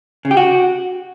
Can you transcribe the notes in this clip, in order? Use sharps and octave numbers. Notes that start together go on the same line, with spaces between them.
C#3
G4
F#4